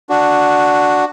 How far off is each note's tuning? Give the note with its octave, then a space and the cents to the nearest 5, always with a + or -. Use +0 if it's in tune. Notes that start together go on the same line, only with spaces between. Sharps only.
D4 +0 F#4 +0